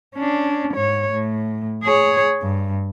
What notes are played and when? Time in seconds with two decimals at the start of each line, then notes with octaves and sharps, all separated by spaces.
0.15 C#4 D4
0.74 G#2 C#5
1.13 A2
1.84 G#4 C#5
2.43 G2